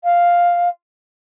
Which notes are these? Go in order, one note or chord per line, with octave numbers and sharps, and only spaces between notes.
F5